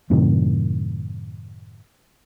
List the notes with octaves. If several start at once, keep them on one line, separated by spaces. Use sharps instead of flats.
F#2 A2 C3 D#3